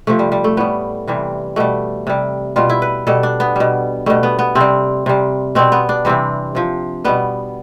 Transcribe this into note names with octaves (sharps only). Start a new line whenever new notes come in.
C3 F3 A3
G3
G3
A3
A2 G3 B3
C3 E3 G3
B2 G3 A3
C3 G3
B2 G3 F4
E4
B4
B2 G3 A4
D4
B3
B2 G3
B2 G3 A3
B3
B3
C3 C4
G3
C3 G3
B2 G3 C4
B3
D4
C3 E3 G3 C4
C3 F3
B2 G3 B3